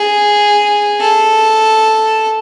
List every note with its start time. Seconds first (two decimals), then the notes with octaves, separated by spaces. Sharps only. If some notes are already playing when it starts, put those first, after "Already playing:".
Already playing: G#4
1.01 A4